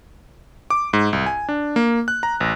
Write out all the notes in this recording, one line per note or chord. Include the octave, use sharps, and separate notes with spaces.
D6
G#2
C2
G#5
D4
A#3
F#6
A#5
A1